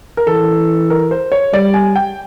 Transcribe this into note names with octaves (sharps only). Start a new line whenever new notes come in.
A#4
E3 A4
A#4
C5
C#5
G3 D5
G#5
G5